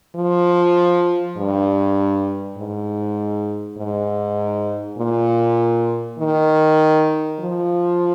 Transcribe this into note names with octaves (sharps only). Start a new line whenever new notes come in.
F3
G2
G#2
G#2
A#2
D#3
F3